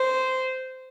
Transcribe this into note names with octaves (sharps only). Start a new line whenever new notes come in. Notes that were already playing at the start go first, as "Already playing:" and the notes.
Already playing: C5